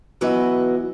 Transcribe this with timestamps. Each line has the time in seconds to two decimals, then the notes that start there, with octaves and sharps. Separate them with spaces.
0.21 E3 F#3 B3 E4 F#4 D#5